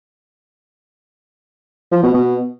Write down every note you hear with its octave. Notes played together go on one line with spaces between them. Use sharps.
F3
B2
B2